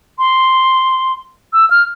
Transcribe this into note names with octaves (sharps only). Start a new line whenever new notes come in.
C6
E6
F6